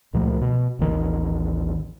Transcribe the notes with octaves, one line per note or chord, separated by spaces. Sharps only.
C#2 A#2 F3 A3
B2
A1 D#2 D#3 E3